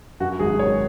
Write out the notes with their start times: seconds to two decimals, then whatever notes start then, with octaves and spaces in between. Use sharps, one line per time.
0.20 F#2 F#4
0.40 G#1 G#4
0.59 D#3 C#5